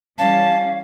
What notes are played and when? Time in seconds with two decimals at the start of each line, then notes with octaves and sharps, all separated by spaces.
0.18 E3 G3 C#4 F5 A5